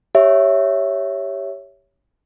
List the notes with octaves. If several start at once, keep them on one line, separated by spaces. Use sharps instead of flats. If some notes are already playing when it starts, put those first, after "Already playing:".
G4 C#5 E5